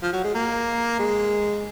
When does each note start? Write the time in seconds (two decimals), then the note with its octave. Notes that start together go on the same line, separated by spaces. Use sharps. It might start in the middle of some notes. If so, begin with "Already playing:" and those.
0.02 F3
0.13 F#3
0.24 G#3
0.34 A#3
0.99 G#3